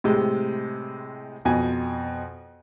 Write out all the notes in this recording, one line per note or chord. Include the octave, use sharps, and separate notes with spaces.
A2 C3 G#3
F2 B2 G#5